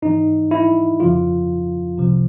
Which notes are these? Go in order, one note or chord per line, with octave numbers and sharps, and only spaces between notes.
G#2 E3 D#4
E4
F2 C#3 F3 F4
C2 C3 F3